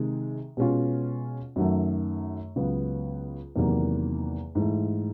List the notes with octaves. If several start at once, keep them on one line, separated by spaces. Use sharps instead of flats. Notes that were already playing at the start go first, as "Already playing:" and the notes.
Already playing: C3 D#3 G#3
B2 G#3 C#4 F4
F#2 D#3 F#3 A3
C#2 C#3 F#3 B3
E2 C3 D#3 F#3 A#3
G#2 E3 A3